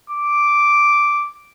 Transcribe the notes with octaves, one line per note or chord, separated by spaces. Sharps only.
D6